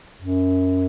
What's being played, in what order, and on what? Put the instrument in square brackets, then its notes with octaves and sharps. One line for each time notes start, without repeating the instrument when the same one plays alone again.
[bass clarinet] F#2